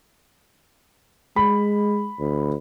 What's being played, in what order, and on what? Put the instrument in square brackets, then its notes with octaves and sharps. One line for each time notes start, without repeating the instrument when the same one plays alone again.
[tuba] G#3 [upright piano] B5
[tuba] D2